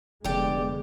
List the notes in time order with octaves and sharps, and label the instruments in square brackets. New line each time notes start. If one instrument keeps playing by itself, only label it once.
[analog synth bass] F1 [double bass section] D3 G#3 B3 [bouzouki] G4 D5